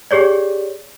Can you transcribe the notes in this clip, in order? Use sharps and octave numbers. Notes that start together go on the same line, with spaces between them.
G4 G#4 C#5 D5